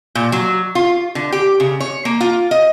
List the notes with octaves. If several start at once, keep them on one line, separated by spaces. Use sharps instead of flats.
A#2
F#3
F4
D3
G4
C#3
C#5
A#3
F4
D#5